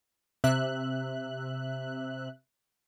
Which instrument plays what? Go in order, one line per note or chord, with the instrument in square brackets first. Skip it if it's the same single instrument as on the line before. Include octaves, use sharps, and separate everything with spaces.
[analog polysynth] C3 E5 F#6